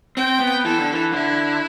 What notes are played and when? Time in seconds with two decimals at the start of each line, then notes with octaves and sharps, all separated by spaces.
0.17 C4 G5
0.40 B3
0.65 E3 A4
0.78 D3
0.92 E3
1.13 D3 E4